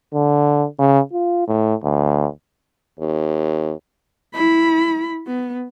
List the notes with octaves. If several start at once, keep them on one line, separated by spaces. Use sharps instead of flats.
D3
C#3
F4
A2
D2
D#2
E4 B5
B3